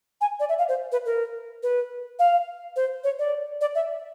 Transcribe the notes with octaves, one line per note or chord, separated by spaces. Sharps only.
G#5
D5
E5
F5
C5
B4
A#4
B4
F5
C5
C#5
D5
D5
E5